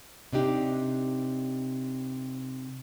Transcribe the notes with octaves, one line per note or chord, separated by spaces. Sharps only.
C3 D4 D#4 G4